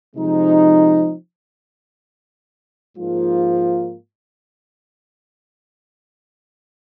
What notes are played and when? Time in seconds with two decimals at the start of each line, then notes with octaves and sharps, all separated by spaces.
0.16 C3 F3 G#3 C4 D#4
2.97 G#2 F3 A#3 F4